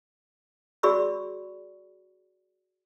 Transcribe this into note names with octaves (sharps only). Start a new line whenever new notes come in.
F#4 G#4 D5 B5 C#6 E6